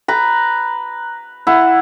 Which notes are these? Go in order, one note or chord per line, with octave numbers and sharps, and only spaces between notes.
B4 A#5
E4 F#5